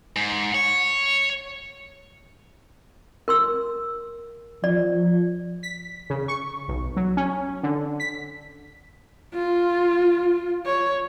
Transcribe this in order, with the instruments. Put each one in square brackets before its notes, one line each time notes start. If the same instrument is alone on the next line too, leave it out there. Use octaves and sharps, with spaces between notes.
[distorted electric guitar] G#2
C#5
[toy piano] A#4 C6 E6
[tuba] F3 [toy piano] D5
[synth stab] B6
C#3
C#6
B1
F#3
C#4
D3
B6
[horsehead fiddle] F4
C#5